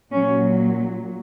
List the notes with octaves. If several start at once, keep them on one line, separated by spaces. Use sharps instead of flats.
A#2 F#3 C#4